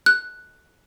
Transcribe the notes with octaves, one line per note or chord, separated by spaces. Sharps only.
F#6